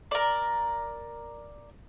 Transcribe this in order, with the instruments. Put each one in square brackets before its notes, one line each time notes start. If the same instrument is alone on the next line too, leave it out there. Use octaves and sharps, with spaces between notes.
[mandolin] A#4 D5